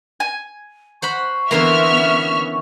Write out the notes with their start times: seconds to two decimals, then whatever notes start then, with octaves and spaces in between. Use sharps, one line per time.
0.20 G#5
1.02 C5 F#5 B5 C#6
1.51 D3 E3 A#3 B3 A#4 E5 C6 F6
1.97 C#4